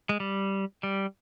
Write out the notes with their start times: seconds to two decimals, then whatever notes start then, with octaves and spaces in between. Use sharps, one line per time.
0.09 G#3
0.20 G3
0.83 G3